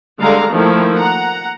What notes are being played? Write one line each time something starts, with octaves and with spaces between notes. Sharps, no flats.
D3 G3 G#3 G4 F5 A#5
D#3 F3 A3 A#3 E4
F#5 A#5